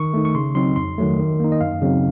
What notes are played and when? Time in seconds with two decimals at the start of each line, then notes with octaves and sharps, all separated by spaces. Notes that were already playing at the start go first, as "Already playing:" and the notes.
Already playing: D#3 C#6
0.14 A3 D#4
0.25 C#6
0.35 C#3 C6
0.55 F#3 C4 D#4 C6
0.76 F2 C6
0.98 D#3 F#3 A3
1.19 D#3
1.40 A#3 D#4
1.52 D#5
1.61 F#2 F5
1.82 C#3 F#3 C4 D#4